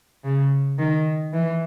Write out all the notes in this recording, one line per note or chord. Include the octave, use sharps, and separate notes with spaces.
C#3
D#3
E3